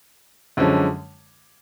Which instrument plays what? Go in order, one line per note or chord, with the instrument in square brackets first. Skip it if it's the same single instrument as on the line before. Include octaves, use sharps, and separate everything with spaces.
[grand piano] F#2 D3 F3 G#3 C#4